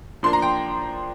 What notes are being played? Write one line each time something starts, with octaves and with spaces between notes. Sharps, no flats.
F3 A#3 D4 C6
A#5
G5